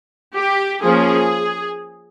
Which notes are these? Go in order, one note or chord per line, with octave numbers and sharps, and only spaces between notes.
G4
F3 A#3 C#4 G#4